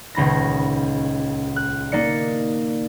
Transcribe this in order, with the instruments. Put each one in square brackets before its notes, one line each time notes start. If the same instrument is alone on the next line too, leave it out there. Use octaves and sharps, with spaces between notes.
[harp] D#1 C#2 B5 A#6
F#6
A#3 D#4 D5 C#7